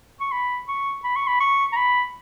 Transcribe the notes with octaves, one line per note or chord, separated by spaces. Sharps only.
C#6
B5
C#6
B5
C#6
B5
C#6
A#5
B5